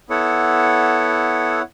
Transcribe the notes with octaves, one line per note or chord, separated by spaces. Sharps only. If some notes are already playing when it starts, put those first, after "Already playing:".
B3 E4 A4 C#5 F#5